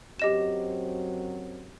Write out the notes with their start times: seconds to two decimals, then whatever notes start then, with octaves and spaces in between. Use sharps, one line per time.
0.19 F#2 F#3 C4 G4 D#5 E7